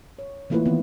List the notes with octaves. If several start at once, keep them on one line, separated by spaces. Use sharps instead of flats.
C#5
E3 A3 A#3 E4 F4 B4
D#3 E3 B3 C4